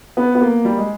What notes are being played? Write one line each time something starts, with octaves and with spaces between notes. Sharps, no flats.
B3
B3
A#3
G3
G#3